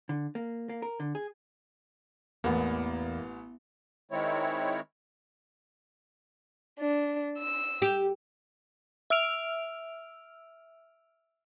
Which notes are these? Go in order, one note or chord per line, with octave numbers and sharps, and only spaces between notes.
D3
A#3
A#3
A#4
D3
G#4
A1 E2 A#3 B3
D#3 G#3 C4 E4 C#5
D4
E6
G4
E5 E6 F6 D7 F7